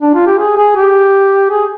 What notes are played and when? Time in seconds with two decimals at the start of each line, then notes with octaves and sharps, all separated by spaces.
0.02 D4
0.15 F4
0.27 G4
0.39 G#4
0.57 G#4
0.76 G4
1.51 G#4